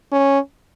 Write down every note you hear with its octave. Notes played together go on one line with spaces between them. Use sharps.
C#4